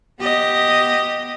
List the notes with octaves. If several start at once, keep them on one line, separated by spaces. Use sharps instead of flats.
B3 G4 D#5